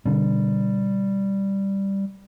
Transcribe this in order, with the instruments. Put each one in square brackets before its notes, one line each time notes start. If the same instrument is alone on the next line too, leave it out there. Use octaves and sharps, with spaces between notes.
[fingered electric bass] B2 D3 [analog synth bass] G3